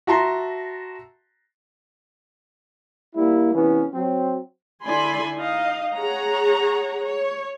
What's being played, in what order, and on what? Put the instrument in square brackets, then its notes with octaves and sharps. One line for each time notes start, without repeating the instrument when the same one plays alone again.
[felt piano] F#4 E5 A5 A#5 C6
[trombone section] G3 A#3 E4
C3 E3 B3 C#4
F#3 C4
[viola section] D3 E4 D5 G#5 B5 C6
D#4 D#5 F5
G#4 C#5 F#5 A#5
C#5